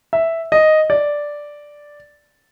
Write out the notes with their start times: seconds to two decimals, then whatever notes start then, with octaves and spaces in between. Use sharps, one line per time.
0.13 E5
0.52 D#5
0.90 D5